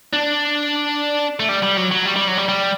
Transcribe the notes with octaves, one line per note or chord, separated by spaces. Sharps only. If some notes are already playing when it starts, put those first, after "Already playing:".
D4
A3
G3
G3
F#3
F#3
G3
G3
F#3
G3
G3